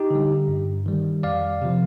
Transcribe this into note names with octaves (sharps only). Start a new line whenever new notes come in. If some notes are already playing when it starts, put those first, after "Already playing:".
Already playing: D#4 G4
D3 G3
G2
D#3 G3
F2 D5 F5
C3 F3